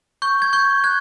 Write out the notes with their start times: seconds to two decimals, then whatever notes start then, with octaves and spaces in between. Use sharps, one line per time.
0.22 C#6 G6
0.42 G#6
0.53 C#6 G6
0.84 F#6 G#6